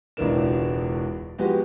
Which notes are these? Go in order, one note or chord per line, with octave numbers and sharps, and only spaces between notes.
E1 C#2 E3 D4 A#4 E7
F3 F#3 G#3 B3 F#4 G4